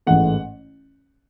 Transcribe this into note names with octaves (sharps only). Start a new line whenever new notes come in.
A1 G#2 E3 A3 F#5